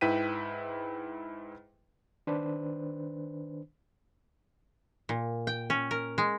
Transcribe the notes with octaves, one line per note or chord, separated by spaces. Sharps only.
G#2 E4 B4 G5 B6 D#7
D#3 D4 B4 C5
A#2
G5
C#4
A#4
G#3